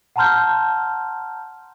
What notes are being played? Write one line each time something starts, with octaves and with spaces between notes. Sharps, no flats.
F#5 A5 A#5 C6 F6 G6